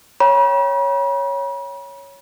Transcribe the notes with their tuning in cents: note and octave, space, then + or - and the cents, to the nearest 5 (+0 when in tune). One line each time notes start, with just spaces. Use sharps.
C#5 +0 G5 +0 B5 -45